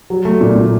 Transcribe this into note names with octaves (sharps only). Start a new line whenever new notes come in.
F#3
A3
A#2
A#2